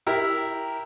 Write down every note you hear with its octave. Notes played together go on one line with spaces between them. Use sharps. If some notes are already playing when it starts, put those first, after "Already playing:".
E4 G4 A#4 E5